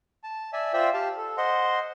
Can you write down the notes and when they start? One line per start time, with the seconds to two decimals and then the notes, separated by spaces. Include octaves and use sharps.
0.24 A5
0.53 D5 E5 G#5
0.73 F4 C5 D5 E5 G5
0.94 G4 F5 A5
1.17 A4
1.37 C5 D#5 F#5 C6